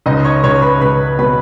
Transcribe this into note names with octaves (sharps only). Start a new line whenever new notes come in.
C#2 D#4 D#5
C#5 C#6
C#2 C#5 C#6
B4 B5
C#2 B4 B5
B2 B4 B5